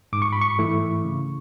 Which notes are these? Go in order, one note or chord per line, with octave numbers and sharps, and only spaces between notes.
G#2 D6
C#6
B5
C#6
E3 A3 E4
C#3